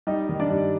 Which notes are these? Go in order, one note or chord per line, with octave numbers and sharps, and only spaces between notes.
G3 D#4 D#5
D#3
D4 D5
G2